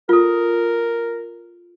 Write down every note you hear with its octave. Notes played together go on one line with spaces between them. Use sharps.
F4 A4 A#4